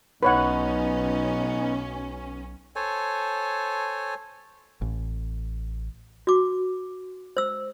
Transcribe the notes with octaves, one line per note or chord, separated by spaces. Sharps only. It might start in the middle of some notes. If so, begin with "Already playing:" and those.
B1 B3 C#4 D#4 B4 C#5 F#5
A4 C5 C#5 G#5
A1
F#4 D6
C5 E6